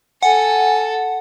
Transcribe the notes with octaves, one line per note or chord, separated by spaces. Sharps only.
A4 F#5 G#5